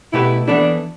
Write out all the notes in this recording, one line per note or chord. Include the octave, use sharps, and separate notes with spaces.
B2 A3 E4 G4 B4
E3 B3 D4 E4 A4